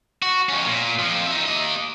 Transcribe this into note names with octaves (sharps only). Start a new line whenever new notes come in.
F#4
F2 C#4
A#2
F2 F3
D#4 E5
A#3 D#5